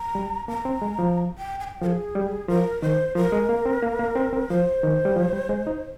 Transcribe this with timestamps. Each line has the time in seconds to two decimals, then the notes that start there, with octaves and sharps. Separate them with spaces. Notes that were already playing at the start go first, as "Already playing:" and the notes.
Already playing: A#5
0.15 G3
0.48 A#3 A#5
0.65 C4
0.82 G#3
0.99 F3
1.38 G5
1.60 G#5
1.64 G5
1.82 F3 A#4
1.86 G#4
2.15 G3
2.49 F3 A#4
2.82 D#3 C5
3.15 F3 A#4
3.32 G#3
3.49 A#3
3.65 C4
3.83 A#3
3.99 A#3
4.16 C4
4.33 C4
4.49 F3 C5
4.83 D#3
5.05 G3
5.16 F3
5.33 G3
5.49 G#3
5.67 D#4